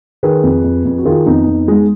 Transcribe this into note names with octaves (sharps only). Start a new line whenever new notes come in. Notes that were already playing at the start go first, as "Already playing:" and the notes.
D#3 G#4 B4
F2
F2
F2
F#4
D#3 F4 G#4
F2 B3 D#4
F2
G#3